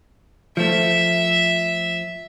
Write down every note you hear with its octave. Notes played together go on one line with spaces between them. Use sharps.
F3 A3 E5